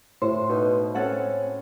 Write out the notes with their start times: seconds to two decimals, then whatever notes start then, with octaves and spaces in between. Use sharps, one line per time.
0.22 A2 C5
0.49 B2 D#4
0.95 C4 C#4 A4 F#5